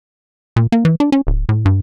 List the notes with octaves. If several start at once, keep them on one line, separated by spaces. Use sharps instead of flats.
A#2
A#3
E3
D4
C#4
D1
A2
G2